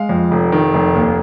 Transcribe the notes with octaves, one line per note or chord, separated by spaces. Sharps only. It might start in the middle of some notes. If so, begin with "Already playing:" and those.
Already playing: G#3 F5
F2
F1
D#3
F1
D#2